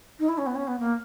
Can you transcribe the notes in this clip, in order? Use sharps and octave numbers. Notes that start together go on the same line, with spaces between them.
D#4
E4
C#4
B3
C#4
B3
A#3